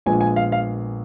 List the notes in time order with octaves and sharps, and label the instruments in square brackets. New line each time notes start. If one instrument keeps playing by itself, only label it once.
[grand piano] A#1 A#2 G#3 B3 G#5
G#5
F5
F5